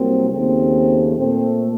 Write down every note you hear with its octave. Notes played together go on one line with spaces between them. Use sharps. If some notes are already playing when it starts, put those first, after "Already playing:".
Already playing: C2 C3 F#3 A#3 C4
D#2 C#3 A3 C4
A#2 A3 C4